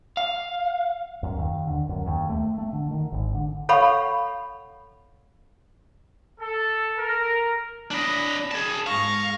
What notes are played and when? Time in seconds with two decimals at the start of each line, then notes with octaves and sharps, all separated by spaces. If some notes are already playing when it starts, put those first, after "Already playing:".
0.17 F5
1.23 F#2
1.38 D#2
1.67 D3
1.89 F#2
2.06 D#2
2.29 A3
2.58 A3
2.72 D3
2.91 D#3
3.12 G#1
3.34 D3
3.69 A4 C#5 F5 F#5 B5 C#6
6.40 A4
6.99 A#4
7.91 D4 D#5 B5
8.52 G#4 A5
8.87 G#2 F5 C#6 A#6